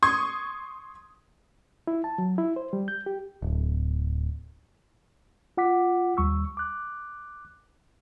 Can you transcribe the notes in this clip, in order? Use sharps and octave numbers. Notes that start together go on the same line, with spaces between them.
C6 C#6 D#6 G#6
E4
A5
F#3
E4
C5
G3
G6
G4
D1
F4 F#5 D6 B6
D#2 G3 C#6 E6
D6 F#6